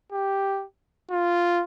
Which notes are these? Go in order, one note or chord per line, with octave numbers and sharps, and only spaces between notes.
G4
F4